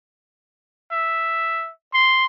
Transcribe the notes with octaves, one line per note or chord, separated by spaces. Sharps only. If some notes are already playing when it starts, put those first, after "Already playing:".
E5
C6